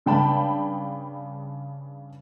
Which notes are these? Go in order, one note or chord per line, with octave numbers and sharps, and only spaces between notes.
G2 C#3 D4 G5 A5 B5